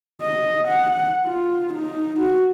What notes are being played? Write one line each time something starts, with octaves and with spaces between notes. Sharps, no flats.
D#5
F#5
F4
D#4
F#4